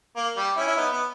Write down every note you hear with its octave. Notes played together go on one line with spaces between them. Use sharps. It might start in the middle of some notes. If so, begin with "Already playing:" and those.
A#3
G3
C#4 E4
E4
B3 D#4
B3